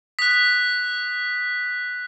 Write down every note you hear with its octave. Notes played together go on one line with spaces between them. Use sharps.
D#6 F#6 B6